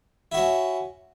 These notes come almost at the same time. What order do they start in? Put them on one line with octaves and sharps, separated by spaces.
E4 F#4 C#4